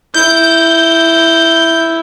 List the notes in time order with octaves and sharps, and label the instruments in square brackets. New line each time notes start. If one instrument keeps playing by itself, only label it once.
[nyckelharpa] E4 [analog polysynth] G6